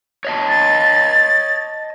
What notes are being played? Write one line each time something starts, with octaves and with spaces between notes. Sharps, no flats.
C#5 D#5 A5
A6